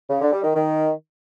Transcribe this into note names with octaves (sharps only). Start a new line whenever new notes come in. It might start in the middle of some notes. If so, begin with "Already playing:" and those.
C#3
D3
G3
D#3
D#3